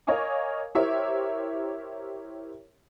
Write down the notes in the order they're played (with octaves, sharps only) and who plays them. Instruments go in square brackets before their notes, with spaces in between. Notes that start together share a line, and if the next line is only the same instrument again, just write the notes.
[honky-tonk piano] A#4 C#5 D#5 F5 G#5 D6
E4 G4 A#4 C5 C#5 E5